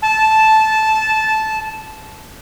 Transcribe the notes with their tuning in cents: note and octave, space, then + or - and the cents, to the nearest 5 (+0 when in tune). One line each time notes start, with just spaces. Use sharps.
A5 -10